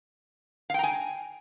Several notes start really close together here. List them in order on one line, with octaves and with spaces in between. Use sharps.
F5 G5 A#5 G#5